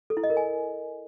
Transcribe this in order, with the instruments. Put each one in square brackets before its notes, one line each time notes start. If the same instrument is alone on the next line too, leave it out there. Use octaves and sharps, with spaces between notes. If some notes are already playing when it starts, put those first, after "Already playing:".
[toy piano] A4
E4
D#5
A#4
G#5